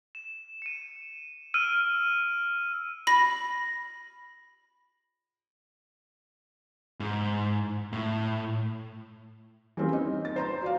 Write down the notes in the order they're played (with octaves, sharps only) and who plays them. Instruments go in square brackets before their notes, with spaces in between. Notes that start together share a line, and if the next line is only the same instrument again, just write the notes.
[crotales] E7
C#7 D#7
E6 F6 D7 D#7
[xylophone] B5 A#6
[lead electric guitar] G#2
A2
[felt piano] E3 G3 A#3 C4 C#4
D#4
A6
C5 A#5 C6
F#4 D5 F5